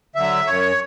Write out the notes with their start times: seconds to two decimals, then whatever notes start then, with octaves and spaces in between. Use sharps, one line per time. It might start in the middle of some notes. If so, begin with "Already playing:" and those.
0.15 D3 F#3 E5
0.47 F#2 C#5